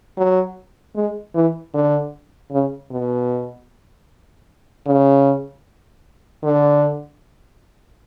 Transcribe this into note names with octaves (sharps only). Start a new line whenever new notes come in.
F#3
G#3
E3
D3
C#3
B2
C#3
D3